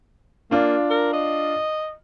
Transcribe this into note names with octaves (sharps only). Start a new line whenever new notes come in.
A#3 D4 F4
A#4
D#5